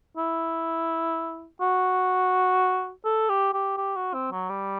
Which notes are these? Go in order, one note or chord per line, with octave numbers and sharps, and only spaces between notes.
E4
F#4
A4
G4
G4
G4
F#4
C4
F#3
G3